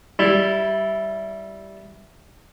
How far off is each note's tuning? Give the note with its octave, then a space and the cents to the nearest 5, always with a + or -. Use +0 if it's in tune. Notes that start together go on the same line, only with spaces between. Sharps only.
G3 -10 E4 +0